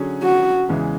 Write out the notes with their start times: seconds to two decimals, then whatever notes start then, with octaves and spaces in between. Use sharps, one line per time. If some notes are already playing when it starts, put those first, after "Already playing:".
Already playing: D3 F#3 C#4 G#4
0.23 F#4
0.69 E2 C#3 E3 G#3